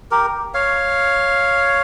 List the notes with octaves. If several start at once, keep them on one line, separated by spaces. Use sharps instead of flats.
G4 A#4
C#5 F5